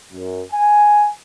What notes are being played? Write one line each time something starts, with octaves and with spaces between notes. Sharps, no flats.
F#2
G#5